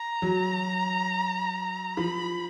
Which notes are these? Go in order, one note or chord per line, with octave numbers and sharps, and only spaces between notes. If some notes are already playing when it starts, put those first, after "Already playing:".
Already playing: A#5
F#3
F3 B5